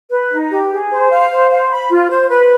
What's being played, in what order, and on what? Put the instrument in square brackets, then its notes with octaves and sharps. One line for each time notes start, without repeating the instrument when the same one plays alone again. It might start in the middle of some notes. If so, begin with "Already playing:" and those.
[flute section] B4
D#4
G4
G#4
C5
F5
C5
F5
B5
F4
C5
B4